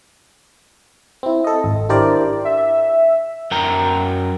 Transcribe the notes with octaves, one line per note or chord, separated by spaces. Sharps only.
C4 E4
A4 D#5
G#1
D4 E4 G4 A#4 C5 D5
E5
F#2 A#4 G5 A#5